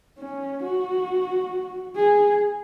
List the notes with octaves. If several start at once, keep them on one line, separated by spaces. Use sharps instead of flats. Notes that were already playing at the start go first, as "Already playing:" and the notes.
C#4
F#4
G#4